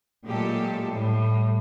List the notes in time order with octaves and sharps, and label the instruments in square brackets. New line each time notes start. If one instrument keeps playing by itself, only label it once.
[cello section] A#2 F#3 G#3 A3 G4 A4
A2 G3